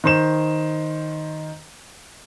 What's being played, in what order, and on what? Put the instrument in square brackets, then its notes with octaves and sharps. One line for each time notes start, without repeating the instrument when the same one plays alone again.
[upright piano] D#3 C5 E7